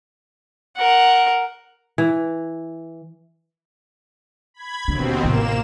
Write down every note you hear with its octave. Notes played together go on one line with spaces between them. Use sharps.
A#4 F#5
E3
B5 G#6
D#2 B2 D3 C4
A1 C3 A#3 E7